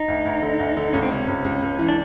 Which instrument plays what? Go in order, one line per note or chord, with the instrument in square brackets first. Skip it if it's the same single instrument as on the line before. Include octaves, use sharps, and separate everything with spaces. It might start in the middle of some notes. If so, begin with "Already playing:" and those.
Already playing: [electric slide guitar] D#4
[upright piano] D2
D2
D3
D2
D3
[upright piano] C#2 [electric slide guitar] C#4
[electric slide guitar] C4
[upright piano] C3 [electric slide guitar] C#4
[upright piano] C#2
C#2
C#2
E3
[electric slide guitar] D4